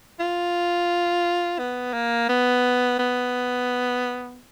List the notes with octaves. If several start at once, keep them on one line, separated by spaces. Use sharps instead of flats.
F4
B3
A#3
B3
B3